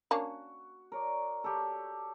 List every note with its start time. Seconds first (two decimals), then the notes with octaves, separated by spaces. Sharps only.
0.11 A#3 C#4 D4 F#4
0.92 A#4 C#5 D5
1.44 G4 A4